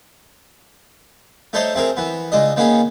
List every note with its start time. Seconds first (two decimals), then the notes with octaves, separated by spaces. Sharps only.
1.53 A3 D#4 A4 C5 C#5 D#5
1.75 A3 C4 G#4 A#4
1.97 E3 B3
2.32 C#2 G#3 D4 D#5
2.56 D#3 A#3 B3 C#4 G#4